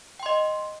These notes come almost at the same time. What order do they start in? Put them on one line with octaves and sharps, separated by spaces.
G5 C6 D#5